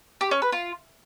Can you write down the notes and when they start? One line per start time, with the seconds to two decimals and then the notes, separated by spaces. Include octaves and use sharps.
0.21 G4
0.31 C#4
0.42 B4
0.52 F4